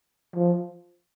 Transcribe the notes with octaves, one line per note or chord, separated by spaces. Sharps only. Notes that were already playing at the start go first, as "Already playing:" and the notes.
F3